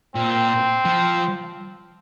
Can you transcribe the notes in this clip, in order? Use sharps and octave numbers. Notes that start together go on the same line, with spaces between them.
A#2 C4
F3